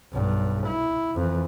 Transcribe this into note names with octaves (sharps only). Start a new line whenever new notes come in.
B1 G2
E4
F2 E3